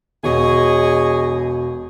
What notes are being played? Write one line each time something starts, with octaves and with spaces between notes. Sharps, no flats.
E1 G#4 C#5 D#5